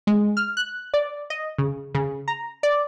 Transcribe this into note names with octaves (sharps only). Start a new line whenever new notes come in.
G#3
F6
F#6
D5
D#5
C#3
C#3
A#5
D5